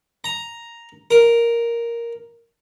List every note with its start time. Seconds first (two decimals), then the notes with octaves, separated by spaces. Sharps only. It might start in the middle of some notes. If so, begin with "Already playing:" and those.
0.24 A#5
1.11 A#4